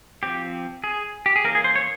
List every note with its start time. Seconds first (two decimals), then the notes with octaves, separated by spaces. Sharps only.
0.23 F3 C4 G4
0.84 G#4
1.26 G4
1.36 G#4
1.44 E3 A#3 C#4 A#4
1.55 G#4
1.64 C5
1.75 C#5